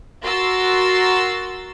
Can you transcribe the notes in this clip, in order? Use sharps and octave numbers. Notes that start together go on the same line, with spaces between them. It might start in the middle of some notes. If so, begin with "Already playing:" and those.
F#4 A#4 C6 E6 A6